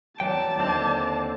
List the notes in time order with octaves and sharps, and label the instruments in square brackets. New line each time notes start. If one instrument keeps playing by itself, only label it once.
[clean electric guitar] E2 F#3 G5 [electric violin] D5 A5
[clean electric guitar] D#2 D3 C4